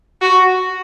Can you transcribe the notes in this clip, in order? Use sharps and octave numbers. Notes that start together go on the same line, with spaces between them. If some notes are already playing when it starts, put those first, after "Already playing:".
F#4